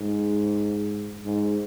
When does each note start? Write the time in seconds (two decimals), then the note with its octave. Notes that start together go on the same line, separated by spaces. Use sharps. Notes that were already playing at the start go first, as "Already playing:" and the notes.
Already playing: G#2
1.24 G#2